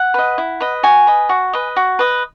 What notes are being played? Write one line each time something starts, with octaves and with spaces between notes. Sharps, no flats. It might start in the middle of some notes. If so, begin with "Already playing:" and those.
Already playing: F#5
B4 D#5
E4
B4 D#5
F#4 G#5
B4 D#5
F#4
B4 D#5
F#4
B4 D#5